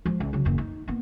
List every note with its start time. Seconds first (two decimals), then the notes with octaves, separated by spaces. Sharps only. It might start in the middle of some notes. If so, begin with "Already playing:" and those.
0.05 F3 G#3
0.20 C#2
0.33 C#3 F#3
0.45 F#1 E2
0.58 D#4
0.88 A#3 B3